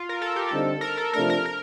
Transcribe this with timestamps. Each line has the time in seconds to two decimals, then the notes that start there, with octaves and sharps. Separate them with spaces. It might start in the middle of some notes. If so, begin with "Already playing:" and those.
Already playing: F4
0.09 A#4
0.22 A4
0.36 G4
0.49 D3 G3 C4 D#4 A4
0.81 A#4
0.98 A4
1.13 C3 F3 A3 D4 A#4
1.30 A#4
1.46 A#4